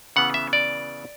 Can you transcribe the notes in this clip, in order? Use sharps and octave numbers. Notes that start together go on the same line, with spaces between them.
C#3 E3 B3 F#5
E5
D5